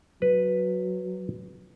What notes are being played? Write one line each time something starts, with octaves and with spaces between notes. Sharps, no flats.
F#3 B4